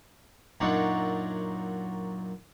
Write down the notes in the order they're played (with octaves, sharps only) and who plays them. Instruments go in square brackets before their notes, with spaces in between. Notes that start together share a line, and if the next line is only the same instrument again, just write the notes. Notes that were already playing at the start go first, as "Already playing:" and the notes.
[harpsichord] F#2 A#2 F#3 D4 D#4 F#4